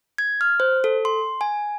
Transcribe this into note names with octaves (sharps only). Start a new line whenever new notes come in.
G#6
F6
C5
A4
C6
G#5